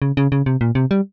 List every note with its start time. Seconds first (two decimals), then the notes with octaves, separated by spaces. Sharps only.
0.02 C#3
0.17 C#3
0.32 C#3
0.46 C3
0.61 A#2
0.75 C3
0.91 G3